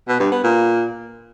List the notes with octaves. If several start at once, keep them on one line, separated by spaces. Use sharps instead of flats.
B2
G2
B3
A#2